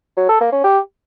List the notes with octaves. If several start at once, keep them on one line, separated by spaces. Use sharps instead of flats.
F#3
A4
A#3
C#4
G4